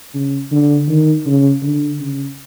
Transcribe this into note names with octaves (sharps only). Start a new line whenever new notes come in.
C#3
D3
D#3
C#3
D3
C#3